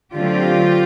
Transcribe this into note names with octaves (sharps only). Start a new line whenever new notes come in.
D3 F#3 A3 C4 F4 G4